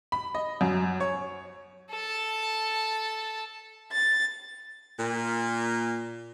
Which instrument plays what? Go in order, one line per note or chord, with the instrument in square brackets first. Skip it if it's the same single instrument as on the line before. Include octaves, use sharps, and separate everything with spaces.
[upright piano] B5
D#5
F#2
C#5
[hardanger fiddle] A4 A5
[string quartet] A6
[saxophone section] A#2